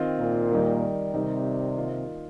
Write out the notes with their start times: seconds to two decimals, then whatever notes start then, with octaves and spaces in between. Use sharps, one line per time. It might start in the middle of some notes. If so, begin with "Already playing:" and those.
Already playing: D#3 C4 F4 D#5
0.19 A#2
0.51 D#3 G3 D#4
1.14 C3 D#3 G3 D#4
1.77 D#3 A#3 F4 D#5